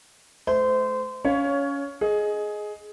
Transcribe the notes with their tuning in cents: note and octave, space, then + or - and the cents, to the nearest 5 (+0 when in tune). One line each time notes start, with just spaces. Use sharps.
A3 -30 C5 -25 E5 -20
C#4 +20 C#5 +10 F5 +5
G#4 +15 D#5 +0